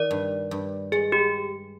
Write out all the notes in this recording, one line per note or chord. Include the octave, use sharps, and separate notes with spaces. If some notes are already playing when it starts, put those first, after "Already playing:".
Already playing: D#3 D5
G2
G2
G#3 G#4
G4